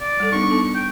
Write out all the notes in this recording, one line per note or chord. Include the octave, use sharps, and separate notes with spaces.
D5
G3 A4
B3 D4 D#4 C#6
B3 D#4 A4
G5